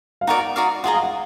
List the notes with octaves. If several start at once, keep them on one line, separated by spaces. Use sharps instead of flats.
F5
D#4 F#4 A#4 D5 F#5
D#4 F#4 D5 F5
F4 G#4 D#5 F#5 A#5
F5
F#5